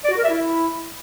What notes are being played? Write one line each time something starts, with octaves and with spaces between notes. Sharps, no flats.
D5
F#4
A#4
E5
E4